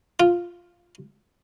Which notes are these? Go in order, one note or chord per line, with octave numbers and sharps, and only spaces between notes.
F4